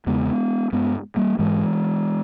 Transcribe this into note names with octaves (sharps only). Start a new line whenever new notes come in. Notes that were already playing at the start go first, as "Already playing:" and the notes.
E2 C#3 G#3 B3
G2 G#3 B3
G3 A#3
G#2 E3 G#3